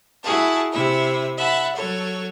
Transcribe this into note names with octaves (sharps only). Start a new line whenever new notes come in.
E4 F#4 G#4 A5
C3 E4 E5
E5 F#5 A5 B5
F#3 A4 C#5